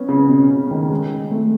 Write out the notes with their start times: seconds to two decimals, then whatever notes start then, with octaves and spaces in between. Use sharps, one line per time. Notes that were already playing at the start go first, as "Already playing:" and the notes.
Already playing: B3 C#4
0.09 C#3
0.29 B2
0.50 C#3
0.71 D#3
0.90 G#3
1.31 A3